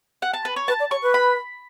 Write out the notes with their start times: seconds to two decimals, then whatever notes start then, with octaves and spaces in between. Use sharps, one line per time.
0.22 F#5
0.33 A5
0.45 B4
0.56 C#5
0.68 B4 A5
0.80 D5
0.91 C#5 C#6
1.02 B4
1.14 B5